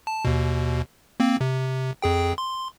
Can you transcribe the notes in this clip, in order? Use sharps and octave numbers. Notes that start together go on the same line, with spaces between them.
A5
D#2 B2
A#3 C4
C3
F2 G#4 G5
C6